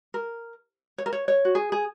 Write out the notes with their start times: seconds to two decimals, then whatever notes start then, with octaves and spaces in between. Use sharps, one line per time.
0.14 A#4
0.98 C#5
1.06 A#4
1.13 C#5
1.28 C#5
1.45 F#4
1.55 G#4
1.72 G#4